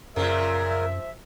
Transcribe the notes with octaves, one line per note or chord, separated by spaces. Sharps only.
F#2 A#2 C#3 F3 A#4 E5